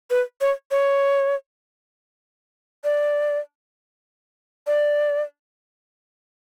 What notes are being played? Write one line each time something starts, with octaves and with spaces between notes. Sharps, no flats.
B4
C#5
C#5
D5
D5